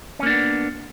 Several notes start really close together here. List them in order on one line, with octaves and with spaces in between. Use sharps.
C#4 A#3 D4 B3